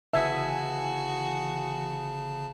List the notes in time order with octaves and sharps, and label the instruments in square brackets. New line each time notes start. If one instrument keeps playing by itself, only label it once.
[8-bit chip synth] G1 C#3 A5 [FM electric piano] E3 G#5 D#6 [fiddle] F#4 [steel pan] E5